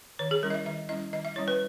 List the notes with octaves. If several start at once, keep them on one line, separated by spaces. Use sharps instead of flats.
D#3 C#5
G#4
G3 C#4 E4 A#4
D#5
E5
D#3 E5
G3 C#4 E4 D#5
D#3 D#5
E5
G3 C#4 E4 C#5
B4